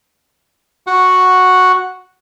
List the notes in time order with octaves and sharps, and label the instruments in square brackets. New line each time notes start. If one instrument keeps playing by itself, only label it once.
[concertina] F#4 F#5